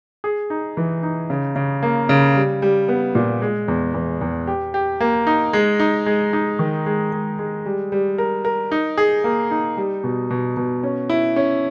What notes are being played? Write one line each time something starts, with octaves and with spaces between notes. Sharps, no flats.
G#4
D#4
E3
D#4
C#3
C#3
A#3
C#3
G3
G3
B3
A#2
G#3
E2
E2
E2
G4
G4
A#3
D#4
G#3
D#4
G#3
D#4
D#3
G#3
G#3
G#3
G3
G3
A#4
A#4
D#4
G#4
A#3
D#4
G3
B2
B2
B2
C#4
E4
C#4